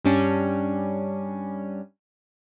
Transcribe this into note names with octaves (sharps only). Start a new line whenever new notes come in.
G2 G3 C#4 D4